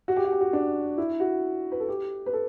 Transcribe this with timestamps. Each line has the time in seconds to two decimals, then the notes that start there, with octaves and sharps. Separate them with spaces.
0.08 F#4
0.16 G4
0.25 F#4
0.32 G4
0.41 F#4
0.53 D4
0.98 E4
1.20 F#4
1.72 B4
1.80 A4
1.88 G4
2.26 B4
2.33 A4